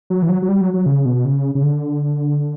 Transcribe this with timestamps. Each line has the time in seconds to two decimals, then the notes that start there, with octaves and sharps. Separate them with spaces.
0.10 F#3
0.22 E3
0.29 F#3
0.42 F#3
0.48 G3
0.61 F#3
0.74 F#3
0.86 C#3
1.05 B2
1.25 C#3
1.55 C#3
1.63 D3